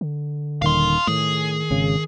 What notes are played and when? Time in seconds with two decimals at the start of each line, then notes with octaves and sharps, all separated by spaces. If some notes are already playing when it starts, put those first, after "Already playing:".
0.01 D3
0.62 D#1 D#3 F5 C6
1.07 A2 D#3 G#4
1.70 G#1 C#3